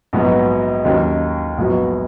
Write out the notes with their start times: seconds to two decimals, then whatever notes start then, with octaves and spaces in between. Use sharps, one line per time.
0.13 A#1 G#2 F#3 B3 F#4
0.85 D#2 D#3 F#3 C#4
1.58 A#1 G#2 F#3 B3 F#4